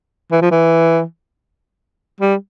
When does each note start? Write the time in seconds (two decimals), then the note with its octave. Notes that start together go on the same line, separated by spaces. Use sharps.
0.32 E3
0.41 F3
0.51 E3
2.21 G3